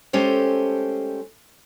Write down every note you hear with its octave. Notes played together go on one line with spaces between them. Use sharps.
G#3 A3 C#4 G4 A4 C5